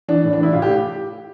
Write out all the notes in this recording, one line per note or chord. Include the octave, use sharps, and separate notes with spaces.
E3 D4
A2
D4
E3
E4
A2 F4
G4